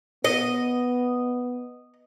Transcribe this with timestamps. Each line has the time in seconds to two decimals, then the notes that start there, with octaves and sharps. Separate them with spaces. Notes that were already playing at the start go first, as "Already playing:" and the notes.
0.24 B3 D#5